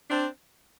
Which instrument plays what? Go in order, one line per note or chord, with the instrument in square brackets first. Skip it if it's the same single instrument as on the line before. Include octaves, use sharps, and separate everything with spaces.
[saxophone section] C4 D4